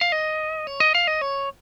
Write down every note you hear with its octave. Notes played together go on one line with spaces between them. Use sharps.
F5
D#5
C#5
D#5
F5
D#5
C#5